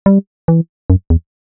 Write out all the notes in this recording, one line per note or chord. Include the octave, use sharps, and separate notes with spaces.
G3
E3
F#2
E2